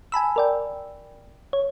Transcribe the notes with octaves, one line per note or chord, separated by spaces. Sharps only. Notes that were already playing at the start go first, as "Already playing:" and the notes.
G#5 A5 B5 E6
A#4 D5 G5
C#5